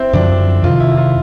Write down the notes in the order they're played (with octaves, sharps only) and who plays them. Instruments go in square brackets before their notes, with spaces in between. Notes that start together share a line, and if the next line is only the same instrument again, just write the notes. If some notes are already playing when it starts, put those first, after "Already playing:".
Already playing: [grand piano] C4 E4
[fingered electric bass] F#2 D3 F3 [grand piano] D4
[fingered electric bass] F2 C3 D#3 [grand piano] F4
[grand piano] E4
E4
F4